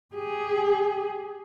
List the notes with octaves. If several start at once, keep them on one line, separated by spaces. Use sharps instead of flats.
G4 G#4